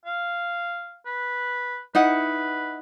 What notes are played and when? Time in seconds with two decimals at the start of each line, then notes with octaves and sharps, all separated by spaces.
0.06 F5
1.06 B4
1.95 D#4 E4 B4 F#5